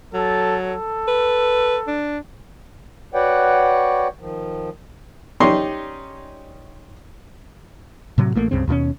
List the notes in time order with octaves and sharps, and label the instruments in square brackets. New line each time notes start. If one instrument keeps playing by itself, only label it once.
[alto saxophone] F#3 [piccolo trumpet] A4
[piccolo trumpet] A4
[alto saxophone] B4
D4
[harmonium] F#4 B4 C#5 D5 F#5 G5
D#3 F3
[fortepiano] C#4 D#4 G4 D5 C6 C#6
[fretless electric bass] A2 C3 F#3
A1 A3 A#3
C#2 G2 C#3 C4
D#2 B2 A3 C#4